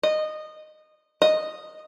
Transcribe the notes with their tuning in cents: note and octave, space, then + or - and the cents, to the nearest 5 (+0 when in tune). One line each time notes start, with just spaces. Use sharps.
D#5 -15
D#5 -5